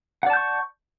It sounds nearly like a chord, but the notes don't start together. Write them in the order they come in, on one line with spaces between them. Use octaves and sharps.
F#5 D5 A5 G6 C#6